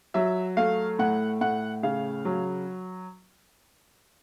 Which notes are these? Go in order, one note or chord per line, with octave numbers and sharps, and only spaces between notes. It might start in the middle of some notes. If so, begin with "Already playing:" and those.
F#3 E5
A3 F5
A2 F#5
A2 F#5
C#3 F5
F#3